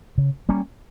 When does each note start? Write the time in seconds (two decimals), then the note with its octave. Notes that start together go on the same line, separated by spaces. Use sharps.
0.18 C#3
0.49 G3 A#3 C#4